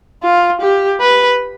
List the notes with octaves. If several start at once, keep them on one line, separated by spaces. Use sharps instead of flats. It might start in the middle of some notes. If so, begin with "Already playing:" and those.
F4
G4
B4